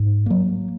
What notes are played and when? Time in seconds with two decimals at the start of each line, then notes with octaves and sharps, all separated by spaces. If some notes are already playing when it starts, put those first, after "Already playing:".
Already playing: G#2
0.26 F#3 A#3